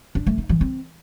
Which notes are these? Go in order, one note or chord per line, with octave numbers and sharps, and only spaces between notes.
D4
A3
D#4
E3
C4